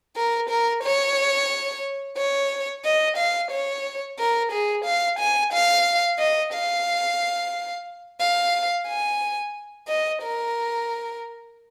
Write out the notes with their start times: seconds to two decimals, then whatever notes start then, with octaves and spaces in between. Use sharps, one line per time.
0.16 A#4
0.49 A#4
0.84 C#5
2.18 C#5
2.85 D#5
3.17 F5
3.51 C#5
4.19 A#4
4.52 G#4
4.85 F5
5.20 G#5
5.53 F5
6.19 D#5
6.53 F5
8.21 F5
8.88 G#5
9.88 D#5
10.23 A#4